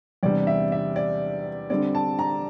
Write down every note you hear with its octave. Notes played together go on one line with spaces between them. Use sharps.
E2 C3 G3 D4 D5
E5
E5
D5
D3 G3 C4 D5
A5
A#5